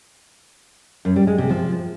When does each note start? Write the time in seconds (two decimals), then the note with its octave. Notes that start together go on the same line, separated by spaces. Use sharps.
1.05 F#2
1.16 G3
1.27 G#3
1.38 C3
1.49 F3